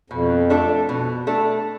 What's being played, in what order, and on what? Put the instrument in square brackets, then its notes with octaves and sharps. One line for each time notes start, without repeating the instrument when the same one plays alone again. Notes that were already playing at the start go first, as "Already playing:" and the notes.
[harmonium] F2 [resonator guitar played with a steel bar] B2
[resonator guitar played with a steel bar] A3 D4 A4
B2
A3 D4 A4